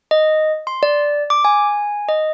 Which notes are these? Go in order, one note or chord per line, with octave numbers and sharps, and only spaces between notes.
D#5
C6
D5
D6
G#5
D#5